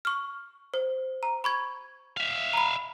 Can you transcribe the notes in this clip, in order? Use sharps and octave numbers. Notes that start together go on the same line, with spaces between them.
C#6 F6
C5
A#5
B5 C#6 G#6
E5 F5
A#5 B5